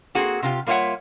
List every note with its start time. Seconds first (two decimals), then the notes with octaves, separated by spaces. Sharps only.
0.15 A#3 C4 F#4 G#4
0.43 C3 F4 G4
0.67 G3 A#3 F4 C#5 E5 F#5